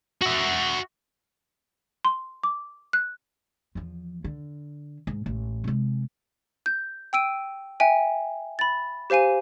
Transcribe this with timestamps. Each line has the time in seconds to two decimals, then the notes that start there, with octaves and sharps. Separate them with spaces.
0.22 F#4 E5
2.05 C6
2.43 D6
2.93 F#6
3.75 E2 F3
4.24 D3
5.07 G#2
5.26 A1
5.64 C3 G#3
6.66 G6
7.13 G5 E6 D7 D#7
7.80 E5 G5 G#5
8.59 B5 A6
9.10 G4 C5 F5 G#5 D#7